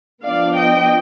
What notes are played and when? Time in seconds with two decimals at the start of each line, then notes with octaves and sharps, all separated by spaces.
0.24 F3 B3 D4 D5 F5
0.55 D#5 G5